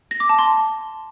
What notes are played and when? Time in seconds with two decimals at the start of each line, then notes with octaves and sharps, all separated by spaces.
0.11 A#6
0.20 D6
0.29 A5
0.39 C6